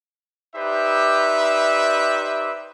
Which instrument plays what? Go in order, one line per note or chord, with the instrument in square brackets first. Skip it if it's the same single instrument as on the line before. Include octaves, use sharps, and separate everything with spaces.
[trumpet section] D#4 G4 B4 C5 D5 E5